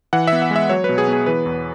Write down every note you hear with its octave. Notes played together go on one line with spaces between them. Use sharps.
E3 F#5
B3 E5
F#5
G#3 E5
F#3 C#5
B4
B2
G#4
B3 G#4
E3 B4
E2